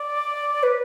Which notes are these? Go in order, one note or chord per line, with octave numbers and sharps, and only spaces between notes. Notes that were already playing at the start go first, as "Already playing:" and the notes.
Already playing: D5
B4